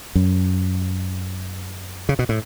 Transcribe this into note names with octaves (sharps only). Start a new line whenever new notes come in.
F#2
C#3
B2
A2